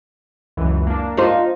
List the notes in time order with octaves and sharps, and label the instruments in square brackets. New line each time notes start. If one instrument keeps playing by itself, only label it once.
[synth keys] C#2 F#2 E3
A#3 D4
[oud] D#4 F4 C5